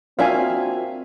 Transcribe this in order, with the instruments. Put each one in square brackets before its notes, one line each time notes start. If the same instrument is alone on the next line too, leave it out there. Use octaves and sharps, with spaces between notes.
[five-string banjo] A#3 D4 E5 [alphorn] C4 [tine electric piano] F4 F#4 [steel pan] F5 G#5